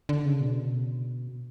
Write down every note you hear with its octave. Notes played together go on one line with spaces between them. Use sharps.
D3
C#3
B2